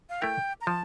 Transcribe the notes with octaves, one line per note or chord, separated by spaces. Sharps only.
F5
A3 E4 A#4 G5
A#5
F3 A5